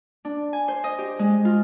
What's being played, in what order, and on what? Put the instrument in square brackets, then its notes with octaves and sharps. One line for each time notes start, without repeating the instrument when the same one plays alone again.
[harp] D4
G#5
C5
D#5
G4
G#3
F4